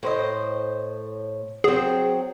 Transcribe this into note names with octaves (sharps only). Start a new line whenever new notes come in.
A2 C5 D#5
F#3 C4 G#4